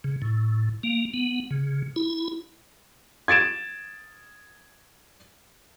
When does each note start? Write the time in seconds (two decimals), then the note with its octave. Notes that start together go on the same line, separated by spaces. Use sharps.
0.04 C#3
0.22 A2
0.83 A#3
1.14 B3
1.51 C#3
1.96 E4
3.28 G#6 A6 D7 E7